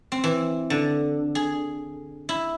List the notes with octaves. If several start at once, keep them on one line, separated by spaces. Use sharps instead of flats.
C4
E3
D3
G#4
E4